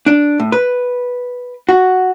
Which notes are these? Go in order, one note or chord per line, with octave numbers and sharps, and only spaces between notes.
D4
A2
B4
F#4